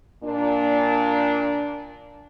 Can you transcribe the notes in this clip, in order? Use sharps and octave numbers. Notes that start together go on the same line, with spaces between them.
A#2 D4